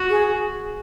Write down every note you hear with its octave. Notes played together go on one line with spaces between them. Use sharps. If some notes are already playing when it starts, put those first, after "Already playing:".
Already playing: F#4
G#4